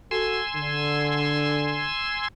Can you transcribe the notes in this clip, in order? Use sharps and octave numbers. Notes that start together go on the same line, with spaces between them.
F#4 A4 G#5 C6 E6
D3